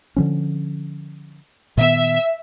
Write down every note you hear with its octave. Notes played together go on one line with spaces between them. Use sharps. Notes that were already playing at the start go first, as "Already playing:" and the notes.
D3 F3 C#4
A#2 D#3 B3 E5